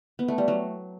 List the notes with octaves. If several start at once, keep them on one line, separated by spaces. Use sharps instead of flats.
B3
A3
G3
F#3